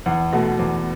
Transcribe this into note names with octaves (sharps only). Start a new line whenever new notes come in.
E2
B2 A3
E2